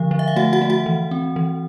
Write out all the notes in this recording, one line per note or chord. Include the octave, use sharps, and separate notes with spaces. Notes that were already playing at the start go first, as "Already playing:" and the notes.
Already playing: D3 F3 F5
F3
E5
F5
A3 F#4 F#5
F#4 F#5
A3
F#4 F#5
E3
C4
E3